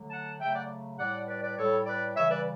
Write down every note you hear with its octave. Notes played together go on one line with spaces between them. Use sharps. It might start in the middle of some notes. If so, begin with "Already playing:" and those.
Already playing: D3 F#3 A3
F#5 A5
C#3 F#3 A3 E5 G5
D5 F#5
A2 G3 D5 F#5
B4 D5
B4 D5
A2 G3 A4 C#5
B4 D5
C#3 E3 G3 C#5 E5
B4 D5